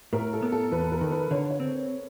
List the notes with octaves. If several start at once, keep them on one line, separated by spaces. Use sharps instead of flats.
A2 A#4
A4
B3
A4
E2 B4
A#4
D#3
B4
D3 C#5
C#5
C4